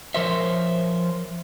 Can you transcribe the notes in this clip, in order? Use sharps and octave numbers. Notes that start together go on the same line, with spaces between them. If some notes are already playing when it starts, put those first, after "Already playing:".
F3 A#4 C5 C#5 E5